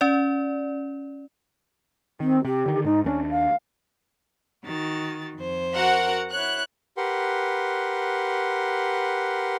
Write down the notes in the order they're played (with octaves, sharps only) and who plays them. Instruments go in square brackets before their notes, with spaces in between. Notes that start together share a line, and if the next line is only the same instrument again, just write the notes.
[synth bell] C#4 D5
[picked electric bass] D#3 [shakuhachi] C4
[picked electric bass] C3 [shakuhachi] G4
[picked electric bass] D3 D#3
[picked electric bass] G#2 [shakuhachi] D#4
[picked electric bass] D#2 A3 D4 [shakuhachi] C#4
[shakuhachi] F5
[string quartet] D#3 F#4 A6
F2 C5
[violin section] F#4 A#4 F#5
[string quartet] E4 C#5 [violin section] F#6
[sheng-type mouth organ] G4 A#4 B4 F#5 C6